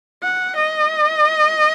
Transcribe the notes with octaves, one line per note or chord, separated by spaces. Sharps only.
F#5
D#5